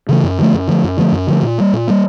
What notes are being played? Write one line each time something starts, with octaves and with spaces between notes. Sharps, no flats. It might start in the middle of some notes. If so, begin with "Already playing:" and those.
C#3 E3 A3
F#2
D3 F3 A3
F#2
D3 F3 A3
F#2
D3 F3 A3
F#2
D3 F3 A3
A#2
G3 A#3
A#2
G3 A#3